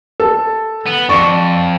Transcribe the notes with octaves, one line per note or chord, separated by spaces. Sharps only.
A4
B3
F2 D5 C#6